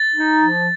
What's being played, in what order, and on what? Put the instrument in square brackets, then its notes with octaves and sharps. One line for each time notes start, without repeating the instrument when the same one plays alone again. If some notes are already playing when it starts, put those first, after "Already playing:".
Already playing: [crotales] A6
[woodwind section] D#4
F3